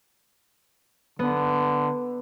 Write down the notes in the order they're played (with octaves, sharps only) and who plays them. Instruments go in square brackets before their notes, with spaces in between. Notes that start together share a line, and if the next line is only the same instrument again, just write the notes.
[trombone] D3 [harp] B3